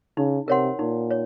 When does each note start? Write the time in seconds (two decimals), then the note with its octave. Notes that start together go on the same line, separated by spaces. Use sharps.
0.17 C#3 D#4
0.48 C3 A#4 C#5 F#5 C6
0.79 A#2 D#4
1.11 C#5